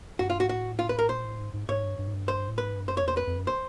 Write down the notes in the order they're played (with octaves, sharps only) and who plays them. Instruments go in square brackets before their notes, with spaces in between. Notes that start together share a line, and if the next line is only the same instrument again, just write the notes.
[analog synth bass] G2 [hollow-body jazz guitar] F#4
[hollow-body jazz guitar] F4
[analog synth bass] G#2 [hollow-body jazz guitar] F#4
[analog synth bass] A2 [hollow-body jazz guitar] F#4
[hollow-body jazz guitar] F4
B4
A#4
[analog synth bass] A#2 [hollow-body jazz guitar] C5
[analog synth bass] A2
G#2
G#2
[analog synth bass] G#2 [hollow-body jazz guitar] C#5
[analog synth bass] G2
G2
G#2
G2
[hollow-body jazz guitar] C5
[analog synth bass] A2
[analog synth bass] G#2 [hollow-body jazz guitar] B4
[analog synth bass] G2
[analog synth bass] F#2 [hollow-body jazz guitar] C5
[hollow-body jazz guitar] C#5
[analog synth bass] E2
[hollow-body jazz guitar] C5
[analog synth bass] F2 [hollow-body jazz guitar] B4
[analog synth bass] F2
F#2
[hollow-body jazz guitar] C5